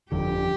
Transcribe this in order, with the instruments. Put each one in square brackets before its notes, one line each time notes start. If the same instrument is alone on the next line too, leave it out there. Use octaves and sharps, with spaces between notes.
[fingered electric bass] G1 F2 D3 [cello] G4